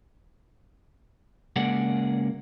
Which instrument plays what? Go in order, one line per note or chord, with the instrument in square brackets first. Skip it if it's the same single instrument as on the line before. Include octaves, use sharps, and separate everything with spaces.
[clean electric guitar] C#3 G#3 A#3 G#4 D5 F#5